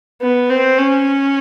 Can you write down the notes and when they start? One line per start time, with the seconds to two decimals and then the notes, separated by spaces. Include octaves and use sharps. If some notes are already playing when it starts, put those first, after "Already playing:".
0.21 B3
0.50 C4
0.78 C#4